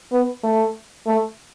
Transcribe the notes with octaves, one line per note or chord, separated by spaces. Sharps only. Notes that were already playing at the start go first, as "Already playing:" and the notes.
B3
A3
A3